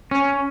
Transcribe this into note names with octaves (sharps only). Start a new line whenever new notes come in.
C#4